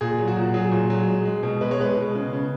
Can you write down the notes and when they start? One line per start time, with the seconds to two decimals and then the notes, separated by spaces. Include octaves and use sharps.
0.01 A#2 G#4
0.18 F#3
0.28 F#4
0.36 A#2
0.54 F#3 G#4
0.72 A#2
0.90 F#3
1.08 G#3
1.25 G#3
1.43 B2
1.61 G#3 B4
1.71 C#5
1.78 G#3 B4
1.97 B2
2.15 C#3
2.33 C#3